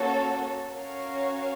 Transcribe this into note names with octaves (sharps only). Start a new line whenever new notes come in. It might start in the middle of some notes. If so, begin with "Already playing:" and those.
Already playing: A#3 C#4 F#4 A4 C#5
C#4 F#4 A#4 C#5 F5